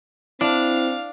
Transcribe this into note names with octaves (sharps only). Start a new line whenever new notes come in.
C4 D4 E4 F5